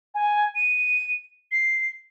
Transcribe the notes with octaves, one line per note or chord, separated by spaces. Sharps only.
G#5
D#7
C7